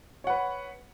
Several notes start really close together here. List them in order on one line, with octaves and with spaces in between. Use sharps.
C#5 F#5 B4